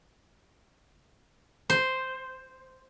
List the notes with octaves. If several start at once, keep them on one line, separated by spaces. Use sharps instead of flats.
C5